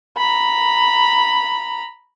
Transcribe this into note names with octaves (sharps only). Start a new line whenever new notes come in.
A#5 B5